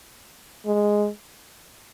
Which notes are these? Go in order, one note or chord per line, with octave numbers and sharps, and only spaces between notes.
G#3